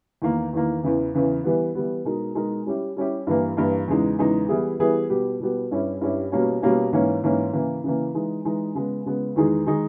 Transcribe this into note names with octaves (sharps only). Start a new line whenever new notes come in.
E2 D#3 A#3
E2 D#3 A#3
E2 C#3 E3
E2 C#3 E3
E3 G3 B3
E3 G3 B3
B2 G#3 D#4 A#4
B2 G#3 D#4 A#4
G3 C#4 E4 G4
G3 C#4 E4 G4
G2 E3 A#3
G2 E3 A#3
E2 C#3 G#3 D#4
E2 C#3 G#3 D#4
E3 G3 B3 E4 G#4
E3 G3 B3 E4 G#4
B2 G3 B3 G4
B2 G3 B3 G4
G2 G3 C#4 E4 G4
G2 G3 C#4 E4 G4
B2 G3 A#3 C#4
B2 G3 A#3 C#4
G#2 E3 A#3 C#4
G#2 E3 A#3 C#4
C#3 E3 A#3
C#3 E3 A#3
E3 G#3 D#4
E3 G#3 D#4
C#3 G#3 B3
C#3 G#3 B3
E2 D#3 G#3 D#4 G#4
D#3 G#3 D#4 G#4